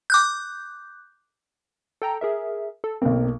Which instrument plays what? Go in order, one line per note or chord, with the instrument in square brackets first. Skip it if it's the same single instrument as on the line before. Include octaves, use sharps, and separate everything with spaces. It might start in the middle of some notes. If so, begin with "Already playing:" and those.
[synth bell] D6 F#6 G6
[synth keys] A4 G5 A#5
G#4 A#4 E5
A4
[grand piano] B1 A#3 [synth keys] C4